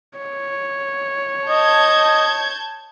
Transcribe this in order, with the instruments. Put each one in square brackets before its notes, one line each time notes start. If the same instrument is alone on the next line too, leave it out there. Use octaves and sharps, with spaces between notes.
[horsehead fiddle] C#5
[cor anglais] D#5 [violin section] A5 G6 G#6